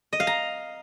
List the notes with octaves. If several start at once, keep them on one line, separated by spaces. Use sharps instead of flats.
D#5
F5
A#5